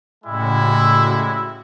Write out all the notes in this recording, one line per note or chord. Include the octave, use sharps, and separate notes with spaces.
A2 C#3 G3 G#3 E4 F#4